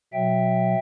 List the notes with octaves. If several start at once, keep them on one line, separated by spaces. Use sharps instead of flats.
B2 F#3 E5 G5